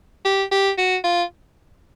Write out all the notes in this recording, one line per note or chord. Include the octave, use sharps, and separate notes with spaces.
G4
G4
F#4
F4